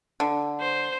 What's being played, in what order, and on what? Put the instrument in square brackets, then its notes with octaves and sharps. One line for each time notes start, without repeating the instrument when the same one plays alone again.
[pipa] D3
[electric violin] C5